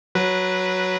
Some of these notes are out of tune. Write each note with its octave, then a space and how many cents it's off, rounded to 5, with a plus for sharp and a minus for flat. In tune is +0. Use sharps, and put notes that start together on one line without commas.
F#3 +0 F#4 +0 B4 -15